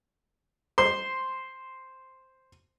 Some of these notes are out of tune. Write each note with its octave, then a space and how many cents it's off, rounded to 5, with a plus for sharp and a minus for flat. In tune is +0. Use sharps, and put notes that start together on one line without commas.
C5 +0 C6 +0